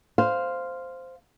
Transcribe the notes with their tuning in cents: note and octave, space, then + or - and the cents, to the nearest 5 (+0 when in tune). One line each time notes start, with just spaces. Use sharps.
C5 -5 F5 +0